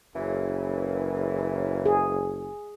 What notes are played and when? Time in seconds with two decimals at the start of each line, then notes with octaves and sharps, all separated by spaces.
0.15 F#1 F#2 C#3 E3
1.86 G#4